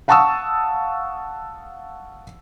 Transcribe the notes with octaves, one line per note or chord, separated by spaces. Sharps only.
F5 F#5 A5 C#6 D#6 E6